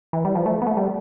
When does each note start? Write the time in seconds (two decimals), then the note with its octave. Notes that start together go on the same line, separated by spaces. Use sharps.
0.13 E3
0.25 G3
0.35 F3
0.46 A3
0.62 B3
0.67 A3
0.77 G3